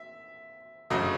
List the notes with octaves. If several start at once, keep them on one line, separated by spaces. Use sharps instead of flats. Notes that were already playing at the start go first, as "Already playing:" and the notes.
Already playing: E5
G1 F#2 C#3 F#3 A3 D#5